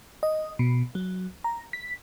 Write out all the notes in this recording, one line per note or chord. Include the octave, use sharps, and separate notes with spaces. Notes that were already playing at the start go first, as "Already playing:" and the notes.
D#5
B2
F#3
A#5
B6